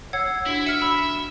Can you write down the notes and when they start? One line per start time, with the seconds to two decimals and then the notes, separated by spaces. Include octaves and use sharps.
0.13 C#5 F#5 E6 G#6 C7
0.46 D4 E4 F#4
0.67 E5 F6 C#7
0.82 B5 E6